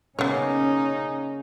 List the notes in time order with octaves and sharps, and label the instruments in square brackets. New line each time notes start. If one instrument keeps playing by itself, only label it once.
[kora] C#3 A#3 [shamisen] B3 C#5 [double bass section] C#4 [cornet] D#4